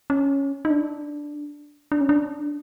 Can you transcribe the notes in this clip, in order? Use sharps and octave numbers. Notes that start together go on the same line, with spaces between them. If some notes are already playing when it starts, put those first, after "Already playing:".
C#4
D#4
D4
D4
C#4
D4